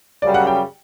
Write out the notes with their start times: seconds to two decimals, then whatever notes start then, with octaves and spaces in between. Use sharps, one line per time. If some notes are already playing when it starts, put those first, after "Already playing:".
0.22 F#2 C#3 G3 D5
0.34 F#5
0.47 G5